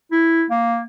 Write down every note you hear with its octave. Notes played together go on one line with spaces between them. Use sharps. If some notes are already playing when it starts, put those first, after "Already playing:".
E4
A#3